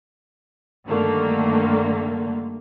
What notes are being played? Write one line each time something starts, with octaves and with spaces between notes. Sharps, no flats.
G2 D3 D#3 A3 A#3